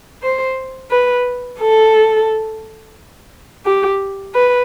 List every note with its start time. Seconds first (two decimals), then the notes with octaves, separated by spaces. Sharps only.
0.23 C5
0.91 B4
1.60 A4
3.66 G4
4.34 B4